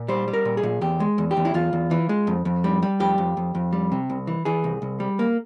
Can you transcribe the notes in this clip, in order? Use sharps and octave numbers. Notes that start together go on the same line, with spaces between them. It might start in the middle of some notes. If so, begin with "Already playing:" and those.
Already playing: A#2
G3 C5
G3
A#4
A#2
G#4
A#2
E2 G4
G#3
E2
G4
E2
E4
E2 F4
E2
E3
G#3
F2
F2
G3
G3
F2 G4
F2
F2
F2
G3
C3
C2
E3
E3 G#4
C2
C2
G3
A#3